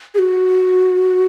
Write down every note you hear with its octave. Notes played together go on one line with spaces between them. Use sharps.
G#4
F#4